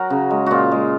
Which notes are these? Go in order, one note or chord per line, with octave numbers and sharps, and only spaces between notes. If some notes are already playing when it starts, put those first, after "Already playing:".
Already playing: F#3 F#4 A#4
C#3
G#3
A#2 F4 F#4
G#3